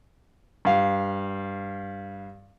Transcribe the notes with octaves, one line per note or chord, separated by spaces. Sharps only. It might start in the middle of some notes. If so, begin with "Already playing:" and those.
G2 F5